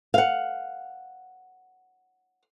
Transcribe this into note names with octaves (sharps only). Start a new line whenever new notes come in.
F5 F#5